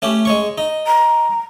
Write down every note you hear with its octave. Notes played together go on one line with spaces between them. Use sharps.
A3 C#4 G4
G#3 C#5 C#6
D#4
A#5